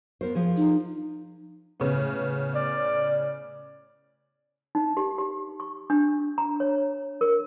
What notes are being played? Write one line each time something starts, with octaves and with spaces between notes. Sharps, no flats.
B3 A#4 C5
F3 G#4
D#4
A2 C#3 B3
D5
D#4
G4
G4
C#6
D4
A#5
C#5
A#4